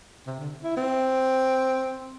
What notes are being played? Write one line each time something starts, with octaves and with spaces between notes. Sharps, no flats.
C3
D3
E4
C4